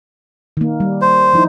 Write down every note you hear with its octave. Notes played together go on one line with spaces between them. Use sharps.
D#3 A#3
G3
C5
F3 D#4 E4